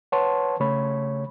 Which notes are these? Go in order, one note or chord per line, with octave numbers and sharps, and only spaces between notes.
B4 C#5 F#5 A5 C6
C#3 A3 C#5 B5